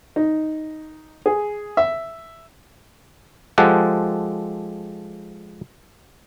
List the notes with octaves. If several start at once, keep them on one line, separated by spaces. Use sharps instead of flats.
D#4
G#4
E5
F3 G#3 G4 A4 F#5